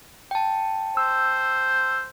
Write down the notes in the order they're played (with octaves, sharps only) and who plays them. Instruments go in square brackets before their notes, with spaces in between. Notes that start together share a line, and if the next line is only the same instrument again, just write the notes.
[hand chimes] G5 A5
[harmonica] C5 [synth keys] E6